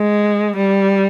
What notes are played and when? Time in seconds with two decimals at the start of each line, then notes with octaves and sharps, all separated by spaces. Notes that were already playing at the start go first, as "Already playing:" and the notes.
Already playing: G#3
0.56 G3